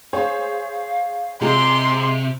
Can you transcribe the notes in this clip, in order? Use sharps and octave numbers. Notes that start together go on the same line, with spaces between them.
G#4 C5 C#5 F5
C3 G#3 F4 A#5 C6